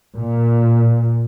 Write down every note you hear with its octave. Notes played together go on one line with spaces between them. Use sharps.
A#2